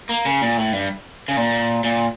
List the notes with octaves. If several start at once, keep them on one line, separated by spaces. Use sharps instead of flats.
A#3
C#3
A#2
A2
G2
C#3
A#2
A#2